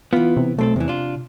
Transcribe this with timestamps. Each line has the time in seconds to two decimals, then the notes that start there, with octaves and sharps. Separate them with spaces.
0.13 E3 B3 F4
0.37 C3
0.59 B1 A3 C4 A4
0.76 E2 C3 E3
0.88 D4 F4